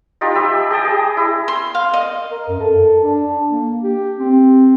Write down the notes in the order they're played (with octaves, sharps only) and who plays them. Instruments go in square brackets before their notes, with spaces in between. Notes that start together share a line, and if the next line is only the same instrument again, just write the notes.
[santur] D#4 F4 G4
G4 E5 B5
A5
G4 D#5 G5 A5
G#4
E4
[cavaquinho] C6
F5
D#5
[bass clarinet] A#4
F#2
A4
D4
A#3
G4
C4